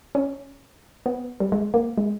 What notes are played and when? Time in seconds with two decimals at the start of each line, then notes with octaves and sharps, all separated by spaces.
0.15 C#4
1.06 B3
1.40 G3
1.52 G#3
1.74 A#3
1.98 G#3